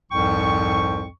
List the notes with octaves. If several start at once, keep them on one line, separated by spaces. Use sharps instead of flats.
C2 F2 G#2 F3 G5 C#6